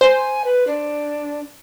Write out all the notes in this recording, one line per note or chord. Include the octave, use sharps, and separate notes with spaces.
C5 G#5
B4
D4